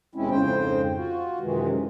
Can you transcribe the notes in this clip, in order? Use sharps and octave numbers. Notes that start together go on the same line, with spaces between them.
D#2 B2 G#3 C4 C#4 E4
F2 G#2 C#3 C5 G5
F4 F#4
F#2 C3 D#3 E3 G#3